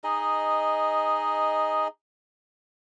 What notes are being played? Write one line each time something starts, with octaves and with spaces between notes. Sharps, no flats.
D#4 G#4 D#5